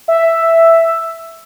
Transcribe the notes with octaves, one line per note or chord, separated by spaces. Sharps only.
E5